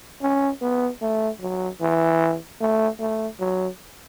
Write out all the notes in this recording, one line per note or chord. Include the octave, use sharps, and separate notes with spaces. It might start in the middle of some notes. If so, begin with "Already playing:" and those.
C#4
B3
A3
F#3
E3
A3
A3
F#3